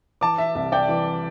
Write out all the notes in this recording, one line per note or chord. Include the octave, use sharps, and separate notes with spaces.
E3 A5 D6
E5
C2 E5
D5 G5
E3